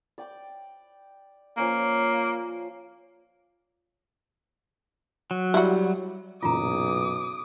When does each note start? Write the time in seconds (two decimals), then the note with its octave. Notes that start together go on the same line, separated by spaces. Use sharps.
0.18 D5 G5 D6
1.57 F3 A#3 C#4 D5
5.31 F#3
5.54 G3 E4 F#4
6.42 F#1 B1 A#2 E3 F4 A#5 D6 D#6